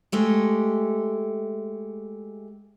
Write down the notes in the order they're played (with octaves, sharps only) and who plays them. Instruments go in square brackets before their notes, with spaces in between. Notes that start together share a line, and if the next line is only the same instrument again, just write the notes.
[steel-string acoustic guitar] G#3 A3 G4